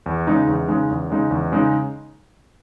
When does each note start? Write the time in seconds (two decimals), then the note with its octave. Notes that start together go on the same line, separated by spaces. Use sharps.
0.06 E2
0.27 C#3 G#3 D#4
0.47 E2
0.68 C#3 G#3 D#4
0.89 E2
1.10 C#3 G#3 D#4
1.31 E2
1.52 C#3 G#3 D#4